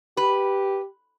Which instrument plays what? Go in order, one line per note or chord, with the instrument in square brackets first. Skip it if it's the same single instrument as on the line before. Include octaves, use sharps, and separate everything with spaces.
[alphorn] G4 [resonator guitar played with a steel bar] B4